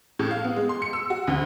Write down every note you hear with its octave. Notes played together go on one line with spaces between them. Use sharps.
A2
F5
B3
G#3
C6
C#7
E6
F#4
D2